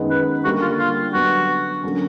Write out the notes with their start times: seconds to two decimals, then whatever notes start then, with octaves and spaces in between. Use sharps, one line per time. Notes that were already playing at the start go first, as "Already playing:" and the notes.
Already playing: F#2 D#3 G#3 B3
0.10 B4
0.44 D3 G3 A#3 F#4
0.62 F4
0.78 F4
1.13 D3 F#3 B3 F#4
1.83 D3 F#3 A#3 C#4